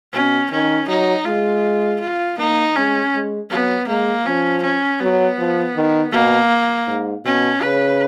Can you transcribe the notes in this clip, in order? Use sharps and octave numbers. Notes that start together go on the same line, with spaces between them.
B2 C#4
D#3 C#4
F#3 D#4
G#3 F4
F4
A#3 D#4
G#3 C#4
G#3
F#3 B3
G#3 A#3
F3 C#4
C#4
F#3 B3
F3
D#3
B2 A#3
G#2
B2 C#4
C#3 B4